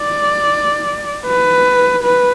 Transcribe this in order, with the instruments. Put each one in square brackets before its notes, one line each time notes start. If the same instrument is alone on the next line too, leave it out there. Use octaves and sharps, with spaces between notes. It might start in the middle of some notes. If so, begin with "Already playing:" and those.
Already playing: [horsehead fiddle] D5
B4
B4